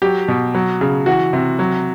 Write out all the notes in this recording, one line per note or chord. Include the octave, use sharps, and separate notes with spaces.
F#3 G4
B2
F#3
C#3
E3 F#4
C3
F#3